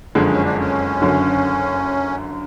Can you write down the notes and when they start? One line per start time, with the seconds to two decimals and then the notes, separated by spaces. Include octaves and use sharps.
0.15 F#1 F2 D3 G#3 C#4
0.29 C#4
0.44 D4
0.58 C#4
1.02 F#1 F#2 D3